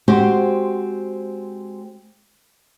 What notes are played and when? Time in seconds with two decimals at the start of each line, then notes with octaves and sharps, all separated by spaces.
0.08 G#3 C4 F#4 G4 C5